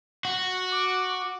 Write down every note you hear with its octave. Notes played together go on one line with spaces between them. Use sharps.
F#4
D6